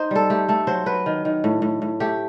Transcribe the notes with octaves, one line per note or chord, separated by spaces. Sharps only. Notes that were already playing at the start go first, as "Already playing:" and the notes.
Already playing: D#4 C5
G3 A4
A3 G4
A3 A4
F#3 C5
F#3 B4
D#3
D#3
A2
A2
A2
A3 G4